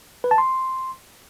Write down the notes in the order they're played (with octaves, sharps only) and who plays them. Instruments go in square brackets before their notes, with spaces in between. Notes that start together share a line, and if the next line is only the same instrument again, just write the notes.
[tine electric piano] B4
A5
C6